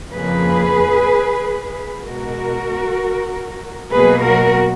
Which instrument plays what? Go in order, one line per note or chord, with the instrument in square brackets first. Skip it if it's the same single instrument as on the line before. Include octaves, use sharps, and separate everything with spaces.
[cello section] F2 C#3 F3 A#3 G#4 B4
B2 G#3 F#4 A#4
B2 F#3 A#3 G#4 B4
F#4 A#4